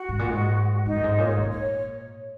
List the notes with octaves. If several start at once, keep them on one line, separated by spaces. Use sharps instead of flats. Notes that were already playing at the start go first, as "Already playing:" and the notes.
Already playing: F#4
G#2
A#2
G#2
G#2 D#4
F#2
G#2
A#2 C#5
G#2
A#2
C#5